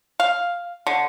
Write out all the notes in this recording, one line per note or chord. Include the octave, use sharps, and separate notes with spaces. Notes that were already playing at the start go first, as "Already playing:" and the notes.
F5
D3